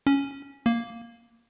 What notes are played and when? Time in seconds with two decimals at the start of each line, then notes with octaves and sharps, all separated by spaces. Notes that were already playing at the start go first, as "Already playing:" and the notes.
0.07 C#4
0.66 A#3